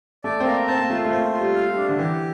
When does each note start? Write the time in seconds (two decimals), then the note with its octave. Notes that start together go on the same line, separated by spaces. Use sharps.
0.24 A3 D5
0.40 C4
0.45 A#3 A#4
0.68 C4 A5
0.79 A#3
0.90 A3 F4
1.05 A3
1.11 A#3 C5
1.33 F4
1.40 G3
1.55 F5
1.70 G3
1.76 D4
1.89 D3
1.98 E3 G4